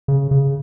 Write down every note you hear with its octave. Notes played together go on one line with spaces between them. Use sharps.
C#3
C#3